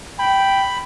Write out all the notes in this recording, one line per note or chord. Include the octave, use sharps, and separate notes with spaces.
G5 B5